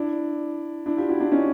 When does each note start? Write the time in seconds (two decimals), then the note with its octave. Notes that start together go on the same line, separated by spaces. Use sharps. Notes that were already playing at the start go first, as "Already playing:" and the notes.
Already playing: D4 E4
0.86 D4 E4
0.97 F4 G4
1.09 E4 F#4
1.20 D4 E4
1.31 C#4 D#4